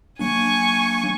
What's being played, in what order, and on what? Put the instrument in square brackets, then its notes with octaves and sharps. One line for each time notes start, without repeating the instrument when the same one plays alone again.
[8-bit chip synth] F#3 A#3 D4 [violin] G#5 C#6